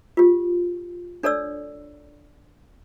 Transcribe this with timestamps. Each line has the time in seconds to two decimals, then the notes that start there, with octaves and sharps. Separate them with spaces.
0.17 F4 G4
1.23 D4 A4 C#5 D5 E6